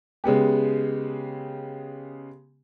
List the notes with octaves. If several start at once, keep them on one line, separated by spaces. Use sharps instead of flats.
C#3 G#3 B3 G4